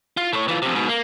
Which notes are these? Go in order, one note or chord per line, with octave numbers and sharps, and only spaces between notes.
F4
A2 C#5
E3 F4
F2 C3
G#2 B2
A#3